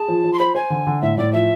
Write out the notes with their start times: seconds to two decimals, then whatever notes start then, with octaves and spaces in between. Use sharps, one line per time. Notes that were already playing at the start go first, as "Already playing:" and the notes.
Already playing: G#4 A5
0.08 F3
0.24 F3
0.33 C6
0.39 C5 B5
0.55 C5 G#5
0.70 D3
0.87 D3
1.02 A2 E5
1.18 A2 D5
1.33 F3 E5